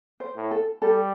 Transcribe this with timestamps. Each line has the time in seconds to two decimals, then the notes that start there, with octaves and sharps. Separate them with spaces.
0.20 C5
0.36 A2
0.51 A4
0.82 G3 A4